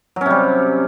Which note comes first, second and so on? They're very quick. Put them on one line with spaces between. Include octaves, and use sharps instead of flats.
F#3 C#4 C3 G3